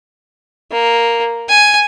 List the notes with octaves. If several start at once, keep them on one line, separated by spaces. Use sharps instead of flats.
A#3
G#5